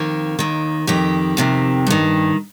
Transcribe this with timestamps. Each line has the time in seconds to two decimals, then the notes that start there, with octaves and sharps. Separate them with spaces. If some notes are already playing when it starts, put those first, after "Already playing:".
Already playing: F2 D#3 A#3
0.39 D#2 D#3
0.87 F2 D#3 G4
1.37 F2 C3 D#3
1.87 G2 D#3